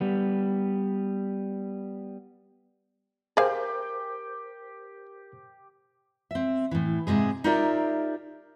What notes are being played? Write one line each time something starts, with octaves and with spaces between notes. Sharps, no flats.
G3 B3
G4 G#4 A#4 C5 F5 G5
C4 E5
A2 E3
G#2 C3 G#3 G#4
D#4 F4 G4 A#4 D5 E5